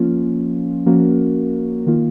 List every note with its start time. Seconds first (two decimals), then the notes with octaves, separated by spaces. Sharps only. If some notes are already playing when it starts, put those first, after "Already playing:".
Already playing: F3 A#3 C#4 F4
0.86 F3 A#3 C#4 F#4 A#4
1.86 D#3 A#3 F4